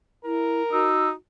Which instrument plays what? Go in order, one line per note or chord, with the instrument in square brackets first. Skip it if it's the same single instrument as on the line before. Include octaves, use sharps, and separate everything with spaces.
[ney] E4 [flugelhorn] A#4
[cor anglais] D#4 [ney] F#4 [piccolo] E6